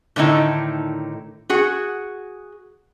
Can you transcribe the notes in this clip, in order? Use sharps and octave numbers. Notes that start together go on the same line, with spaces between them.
A2 D3 D#3 D#4 E4
F#4 G#4 F#5